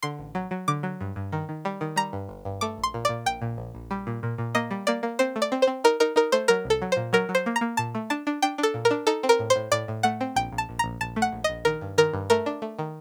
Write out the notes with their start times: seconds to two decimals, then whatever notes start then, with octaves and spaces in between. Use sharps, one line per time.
0.02 D3 C6
0.19 A1
0.35 F#3
0.51 F#3
0.68 D3 D6
0.83 F#3
1.01 G2
1.16 G2
1.32 D#3
1.49 D#3
1.65 G3
1.81 D#3
1.96 G3 A#5
2.13 G2
2.29 G1
2.45 G2
2.61 A3 D6
2.78 A#1
2.83 C6
2.94 A#2
3.05 A#2 D5
3.26 A#1 G5
3.41 A#2
3.58 A#1
3.75 A#1
3.91 G3
4.07 A#2
4.23 A#2
4.38 A#2
4.55 A#3 D#5
4.71 G3
4.87 A#3 D5
5.03 A#3
5.19 C4 C5
5.36 A3
5.42 D5
5.52 C4
5.62 C5
5.67 C4
5.84 D#4 A#4
6.00 D#4 A#4
6.16 D#4 A#4
6.32 A3 C5
6.48 F#3 A#4
6.65 C2
6.70 A4
6.82 F#3
6.92 A#2 C5
7.13 F#3 A#4
7.29 F#3
7.35 C5
7.46 A#3
7.56 A#5
7.61 A#3
7.77 A#2 A5
7.95 A3
8.10 D4 A5
8.27 D4
8.42 D4 G5
8.58 D4
8.63 A4
8.74 A#2
8.85 A#4
8.91 D4
9.07 D#4 A4
9.23 C4
9.29 A#4
9.39 A2
9.50 C5
9.56 A2
9.72 A2 D5
9.88 A2
10.03 A3 F#5
10.21 C4
10.36 A#1 G5
10.52 A#1
10.58 A5
10.69 A#1
10.79 A#1 A#5
11.01 A#1 A5
11.16 A3
11.22 F#5
11.32 A#1
11.44 A#1 D#5
11.65 D#3 A#4
11.81 G2
11.98 D#3 A#4
12.14 G2
12.30 A3 A#4
12.46 D4
12.62 A3
12.79 D#3